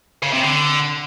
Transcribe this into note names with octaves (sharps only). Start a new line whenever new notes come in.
C#3
C3
D3